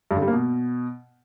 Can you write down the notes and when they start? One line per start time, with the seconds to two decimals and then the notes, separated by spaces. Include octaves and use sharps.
0.11 G2
0.16 D3
0.22 G3
0.28 A#3
0.33 B2